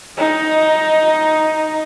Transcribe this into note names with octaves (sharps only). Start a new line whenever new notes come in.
D#4 D#5